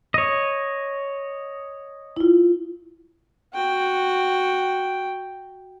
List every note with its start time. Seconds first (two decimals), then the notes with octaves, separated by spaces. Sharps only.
0.14 C#5 D#5
2.17 E4 F4
3.53 F#4 G5